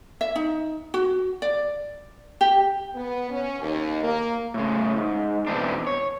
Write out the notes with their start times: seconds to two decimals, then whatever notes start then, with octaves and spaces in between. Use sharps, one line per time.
0.21 E5
0.36 D#4
0.94 F#4
1.42 D5
2.41 G4
2.94 B3
3.30 C#4
3.59 D#2
4.02 A#3
4.54 A2 C#3
4.96 G#2
5.47 B2 E3 C4 D4
5.87 C#5